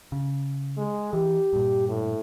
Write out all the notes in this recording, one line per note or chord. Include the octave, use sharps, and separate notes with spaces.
C#3
G#3
E3 G4
G2 A#2
A2